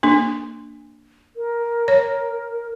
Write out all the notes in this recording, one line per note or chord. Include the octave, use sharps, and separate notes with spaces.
A#3 D4
A#4
C#5